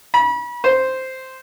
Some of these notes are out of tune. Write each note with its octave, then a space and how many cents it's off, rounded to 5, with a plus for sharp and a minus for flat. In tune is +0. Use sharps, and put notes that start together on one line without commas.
B5 -35
C5 -5